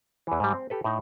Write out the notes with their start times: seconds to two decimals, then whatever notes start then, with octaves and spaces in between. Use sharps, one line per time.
0.27 E2 E3
0.40 G#2 G3
0.54 C4
0.70 G4 A4 B4
0.84 A2 D#4